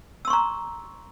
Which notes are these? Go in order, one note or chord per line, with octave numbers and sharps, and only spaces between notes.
A#5 C6 C#6 E6